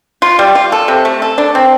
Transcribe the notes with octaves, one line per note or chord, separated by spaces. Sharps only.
F4
G3
F4
A4
C3
A3
A4
D4
C4